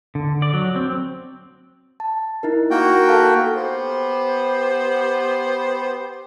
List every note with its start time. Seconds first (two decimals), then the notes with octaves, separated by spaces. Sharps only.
0.15 D3
0.42 D5
0.54 F#3
0.76 C4
2.00 A5
2.43 D#4 E4 A#4
2.71 A#3 F#4 G5
3.08 A4 F5 A5
3.56 B3 G4 C5